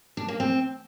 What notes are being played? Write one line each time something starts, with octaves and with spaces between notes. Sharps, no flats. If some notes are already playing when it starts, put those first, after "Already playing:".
D4
A#3
C4